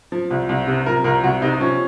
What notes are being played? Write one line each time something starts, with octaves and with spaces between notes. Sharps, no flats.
F3
C2
C2
C3
F3 A#4
C2 A#4
C2 F#4
C3 D#4
F3 C#4